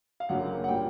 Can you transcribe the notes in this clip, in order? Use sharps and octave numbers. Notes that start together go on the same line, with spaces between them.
F5
F#1 F#2 D3 F#3 A#3 F#5
F#5
A#2 G3 A#3 G5